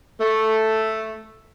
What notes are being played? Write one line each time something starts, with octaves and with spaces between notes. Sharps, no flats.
A3